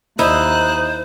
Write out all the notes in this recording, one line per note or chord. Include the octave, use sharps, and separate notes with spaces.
D#2 D#4 E4 C5 F#6